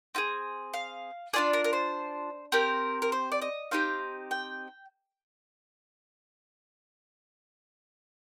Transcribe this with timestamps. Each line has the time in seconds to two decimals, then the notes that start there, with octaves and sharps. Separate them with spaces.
0.15 C4 F4 G#4
0.74 F5
1.33 D4 F4 G#4 D5
1.53 A#4
1.64 A#4
1.73 C5
2.52 C4 G4 A#4
3.02 A#4
3.12 C5
3.32 D5
3.42 D#5
3.71 C4 D#4 G4 F5
4.31 G5